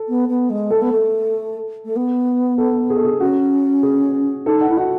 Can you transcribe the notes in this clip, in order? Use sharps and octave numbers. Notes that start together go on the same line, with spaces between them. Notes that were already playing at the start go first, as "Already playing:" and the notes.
Already playing: A4
B3
B3
G#3
A3 A4
B3
A3
A3
B3
A4
G#4
A4
G#4
C#4 F#4
G#4
D#4 A4
F#5
E4
F#4 F#5